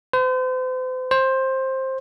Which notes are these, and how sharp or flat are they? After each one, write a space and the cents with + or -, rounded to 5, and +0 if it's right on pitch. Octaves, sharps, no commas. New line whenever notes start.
C5 -40
C5 +15